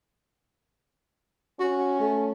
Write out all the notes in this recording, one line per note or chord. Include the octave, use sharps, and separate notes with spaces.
C#4 F#4
A3